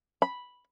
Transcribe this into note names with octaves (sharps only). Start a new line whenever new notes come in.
B5